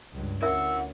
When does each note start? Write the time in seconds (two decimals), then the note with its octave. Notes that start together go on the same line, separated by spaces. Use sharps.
0.13 C#2 G2
0.42 D2 C#4 E4 A#4 E5 F#5 E6